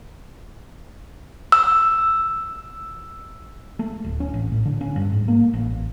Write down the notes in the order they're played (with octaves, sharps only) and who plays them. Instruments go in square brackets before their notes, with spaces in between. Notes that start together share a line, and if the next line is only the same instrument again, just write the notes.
[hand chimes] E6
[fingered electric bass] A3
D1
C#4
A1
A2
D3
C#4
G2
G#2
A#3
A1